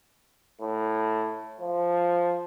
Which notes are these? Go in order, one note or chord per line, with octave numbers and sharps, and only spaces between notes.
A2
F3